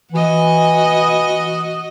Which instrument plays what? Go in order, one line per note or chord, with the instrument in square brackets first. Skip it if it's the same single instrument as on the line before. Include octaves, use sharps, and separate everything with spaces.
[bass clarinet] E3 [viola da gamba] F#4 D#5